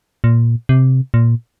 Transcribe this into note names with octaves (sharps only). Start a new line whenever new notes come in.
A#2
C3
A#2